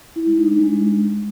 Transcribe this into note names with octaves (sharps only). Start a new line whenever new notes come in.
E4
G#3
D#4
D4
G#3